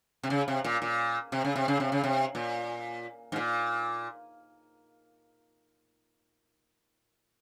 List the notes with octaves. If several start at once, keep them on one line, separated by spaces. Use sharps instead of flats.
C3
C#3
C3
A#2
A#2
C3
C#3
C3
C#3
C3
C#3
C3
A#2
G#2
A#2